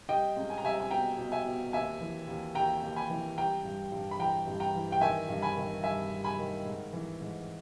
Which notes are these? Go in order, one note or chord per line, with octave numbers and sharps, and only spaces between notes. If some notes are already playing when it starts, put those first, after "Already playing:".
G3 D#5 G5
C#2
G#5
A#5
G3 E5 G#5
G#5
B2 G5 A#5
B2
E5 G#5
B2
D#2 E5 G#5
E3
D#2
D#2 G5 A#5
D#2
G#5 B5
E3
G3 G5 A#5
G2
G2
B5
E3 G5 A#5
G2
G5 A#5
E3
G5
D#3 E5 G#5
G2
G#5 B5
D#3
G2 E5 G#5
G2
G#5 B5
D#3
G#2
E3
G#2